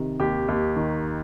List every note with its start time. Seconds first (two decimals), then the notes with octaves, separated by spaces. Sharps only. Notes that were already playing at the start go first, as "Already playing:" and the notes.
Already playing: C3 D#3
0.20 D#2 G4
0.48 D#2
0.76 D#3